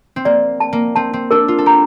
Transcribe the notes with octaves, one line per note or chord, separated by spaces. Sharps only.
C4
A#3 D5
A5
A#3
C4 A5
C4
D4 A#4
F4
A4
G4 A#5